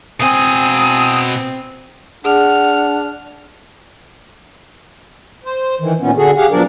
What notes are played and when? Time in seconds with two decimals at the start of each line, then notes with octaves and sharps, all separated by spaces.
0.20 B2 C4 G#5 D#6
2.25 D4 G#4 F#5 F6
5.44 C5
5.80 D#3 E3
6.00 A#2 D#3 B3 C#4
6.17 D3 F#4 G#4 A4
6.37 G4 G#4 F5 F#5 G#5
6.51 B2 F3 F#3 D4 A#4 D5